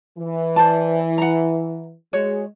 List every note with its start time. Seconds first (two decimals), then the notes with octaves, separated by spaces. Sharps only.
0.17 E3
0.56 C5 D5 A5
1.18 F#5 A#5
2.13 G#3 F#4 C#5